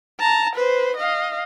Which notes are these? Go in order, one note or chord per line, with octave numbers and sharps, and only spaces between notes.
A5 A#5
B4 C5
D#5 F5